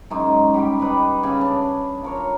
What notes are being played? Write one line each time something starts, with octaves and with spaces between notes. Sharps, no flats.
F#2 G#3 D#4
G3 G4 G5
B4 D5 D#5
C#3 G#4 B5
D4
F4 A#4 C#5